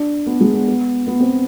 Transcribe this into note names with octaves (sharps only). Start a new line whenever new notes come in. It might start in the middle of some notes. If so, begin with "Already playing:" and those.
Already playing: D4
B3
G#3
B3
B3
B3
C4